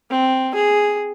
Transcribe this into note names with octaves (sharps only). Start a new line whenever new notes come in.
C4
G#4